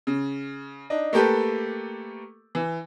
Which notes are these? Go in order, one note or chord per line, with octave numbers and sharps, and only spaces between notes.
C#3
D4 D#4
A3 A#3 G4 A4 B4
E3